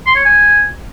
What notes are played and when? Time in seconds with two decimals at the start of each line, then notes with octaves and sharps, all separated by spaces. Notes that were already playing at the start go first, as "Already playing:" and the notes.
0.06 C6
0.16 C#5
0.25 G#5